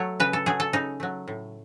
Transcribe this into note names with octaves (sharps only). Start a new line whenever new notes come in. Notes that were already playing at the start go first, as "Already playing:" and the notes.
Already playing: F#3 A3 C#5
C#3 B4
A4
F#3 A3 G#4
A4
C#3 D#4
F#3 A3
A2